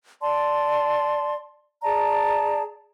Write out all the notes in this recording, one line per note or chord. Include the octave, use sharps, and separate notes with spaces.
D5 A5 C6
G#4 D5 A5 A#5